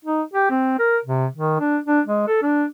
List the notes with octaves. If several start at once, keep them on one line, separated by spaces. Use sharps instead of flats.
D#4
G4
C4
A#4
C3
D#3
D4
D4
G#3
A4
D4